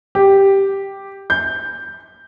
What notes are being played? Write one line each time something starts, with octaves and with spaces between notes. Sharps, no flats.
G4
G6